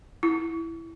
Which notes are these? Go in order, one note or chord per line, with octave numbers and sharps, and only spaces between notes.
E4